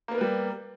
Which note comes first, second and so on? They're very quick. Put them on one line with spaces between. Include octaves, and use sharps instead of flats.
A#3 B3 A#4 B4 G3